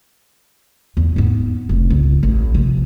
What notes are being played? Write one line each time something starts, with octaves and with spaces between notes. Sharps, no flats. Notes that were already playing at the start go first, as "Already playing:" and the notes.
E2
G#2 B3
F1 B1
C#2
A1
C3 F3